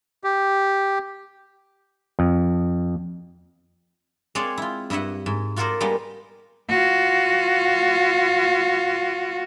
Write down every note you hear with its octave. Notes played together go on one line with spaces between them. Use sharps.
G4
F2
G#3 C4 G#4 C#5 D5 F5
E4 F4
G2 E4 D#5 E5 F#5
G#2
F4 F#4 A4 A#4 C5 D5
G3 G#3 A#3 B3 D#4
F4 F#4